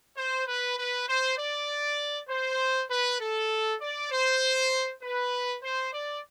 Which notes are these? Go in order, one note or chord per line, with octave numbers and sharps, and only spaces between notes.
C5
B4
B4
C5
D5
C5
B4
A4
D5
C5
B4
C5
D5